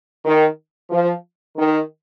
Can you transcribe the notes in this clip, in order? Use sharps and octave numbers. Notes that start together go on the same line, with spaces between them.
D#3
F3
D#3